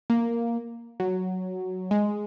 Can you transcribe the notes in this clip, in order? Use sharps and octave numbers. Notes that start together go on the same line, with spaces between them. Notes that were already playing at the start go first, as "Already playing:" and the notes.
A#3
F#3
G#3